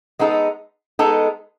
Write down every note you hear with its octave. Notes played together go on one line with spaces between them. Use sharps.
G#3 B3 D#4 A4
G#3 B3 D#4 A4